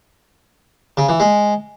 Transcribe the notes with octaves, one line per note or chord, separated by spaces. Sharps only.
C#3
E3
G#3